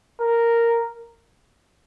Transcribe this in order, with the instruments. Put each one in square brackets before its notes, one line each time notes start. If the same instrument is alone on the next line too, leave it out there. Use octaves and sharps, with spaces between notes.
[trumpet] A#4